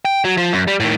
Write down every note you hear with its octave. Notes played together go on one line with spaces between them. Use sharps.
G5
F#3
F3
F#2
G3
A2 D#3